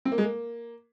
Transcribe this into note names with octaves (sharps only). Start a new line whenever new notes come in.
C4
A#3
G#3
A#3